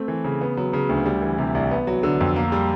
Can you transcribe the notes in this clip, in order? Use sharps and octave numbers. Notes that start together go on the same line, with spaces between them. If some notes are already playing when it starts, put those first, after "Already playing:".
Already playing: A3 C4
E3
C#3
B3
F#3
C#3
D2
G3
E3
C3
C2
B3
F#3
D3
F2
A#3
G3